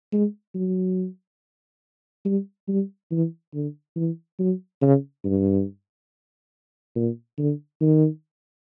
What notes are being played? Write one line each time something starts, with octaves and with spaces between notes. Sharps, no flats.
G#3
F#3
G3
G3
E3
D3
E3
F#3
C#3
G2
A#2
D3
D#3